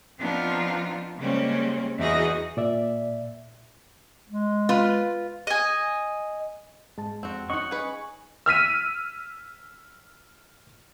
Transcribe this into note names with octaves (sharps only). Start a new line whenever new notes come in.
F3 B3 C4 D4 D#4 F4
C#3 G3 G#3 A#3 C4 C#4
E2 E3 D#4 F#4 G#4 D#5
A#2 D5 E5
G#3
F4 B4
D#5 G#5
G#2 G#3 A5
F2 C4 F#4
C#4 D#4 D#5 F#5 C#6
G#4 B4
E6 F6 B6 D#7